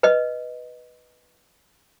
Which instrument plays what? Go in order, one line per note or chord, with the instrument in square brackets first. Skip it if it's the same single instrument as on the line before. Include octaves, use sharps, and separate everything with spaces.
[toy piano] B4 D#5